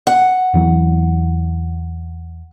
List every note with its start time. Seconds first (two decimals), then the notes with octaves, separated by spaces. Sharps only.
0.07 F#5
0.54 E2 E3 F#3